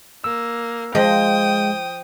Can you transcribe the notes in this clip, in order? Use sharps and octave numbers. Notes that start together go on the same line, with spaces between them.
A#3 E6
F3 G#3 D#5 G5 D#6